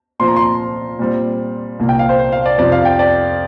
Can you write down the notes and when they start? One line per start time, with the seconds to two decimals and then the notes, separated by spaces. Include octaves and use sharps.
0.19 A#2 F3 C4 C6
0.27 A#5
0.36 C6
0.99 A#2 G3 C4
1.79 C2 A#2 A#3
1.89 G5
1.99 F5
2.09 C5
2.19 C5
2.32 F5
2.46 D5
2.58 F2 C3 F3 D5
2.72 F5
2.85 G5
2.99 D5